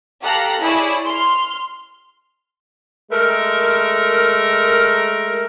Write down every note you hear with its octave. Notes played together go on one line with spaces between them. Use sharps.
G4 A4 F5 A#5 F#6
E4 G#4 C#5 D5
C6 F6
G#3 A3 A#4